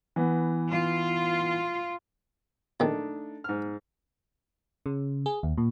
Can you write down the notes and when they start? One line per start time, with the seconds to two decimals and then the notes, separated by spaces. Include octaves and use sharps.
0.16 E3 B3
0.70 F4
2.80 A#1 D#3 A3 D4 D#4
3.44 G#2 F6
4.86 C#3
5.26 G#4
5.43 D#2
5.58 A#2